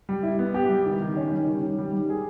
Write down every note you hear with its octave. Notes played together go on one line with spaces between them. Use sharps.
G3
E4
B3
G4
G3
D#3
D#3
C#4
G3
D#3
D#3
G3
G3
G#4